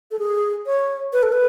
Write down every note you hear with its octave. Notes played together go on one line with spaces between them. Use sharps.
A4
G#4
C#5
B4
A4
B4